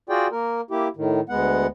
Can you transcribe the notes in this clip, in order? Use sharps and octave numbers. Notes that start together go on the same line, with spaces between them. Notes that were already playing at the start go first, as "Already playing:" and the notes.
F4 F#4 G#4 D5 G5
A#3 A#4
A#3 E4 G4
A2 D#3
D2 G#3 B3 F#5